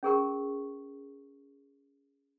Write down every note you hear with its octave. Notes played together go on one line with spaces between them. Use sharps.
C#4 G#4 A#4 C#6